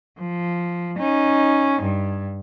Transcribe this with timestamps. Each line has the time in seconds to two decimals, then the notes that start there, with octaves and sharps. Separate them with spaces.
0.19 F3
0.98 C#4 D#4
1.82 G2